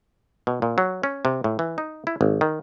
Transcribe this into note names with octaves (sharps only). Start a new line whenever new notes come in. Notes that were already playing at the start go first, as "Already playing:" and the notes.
B2
A#2
F#3
C#4
C3
A2
E3
D#4
E4
G#1
D#3